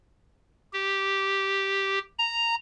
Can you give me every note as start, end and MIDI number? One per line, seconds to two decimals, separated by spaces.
0.73 1.99 67
2.19 2.55 82